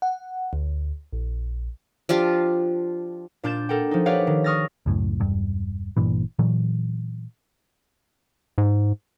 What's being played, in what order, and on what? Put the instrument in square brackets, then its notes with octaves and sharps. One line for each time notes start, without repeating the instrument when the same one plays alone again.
[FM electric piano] F#5
D2
A#1
[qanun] F3 D4 F4 G4
[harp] A#2 D4 F4 G6 A6 E7
A4 A#4 F#5 G5
F3 D#4
G4 B4 C#5 D5 F5 F#5
D#3
C#6 D#6 F6 A6 A#6
[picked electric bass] C#2 F#2 A2
E1 G2
G1 G2 A#2 E3
A#2 E3 F#3
[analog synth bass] G#2